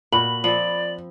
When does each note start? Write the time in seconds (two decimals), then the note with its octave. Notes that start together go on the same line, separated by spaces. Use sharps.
0.12 A#2 F#4 B5 F#7
0.44 F3 C4 D5 F#7